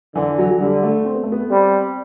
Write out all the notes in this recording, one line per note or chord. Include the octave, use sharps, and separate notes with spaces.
D3 E3
F#3
F#3
D3 G3
A3
C4
B3
A3
B3
G3 C4